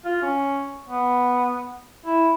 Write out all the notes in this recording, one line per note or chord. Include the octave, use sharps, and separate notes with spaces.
F4
C#4
B3
E4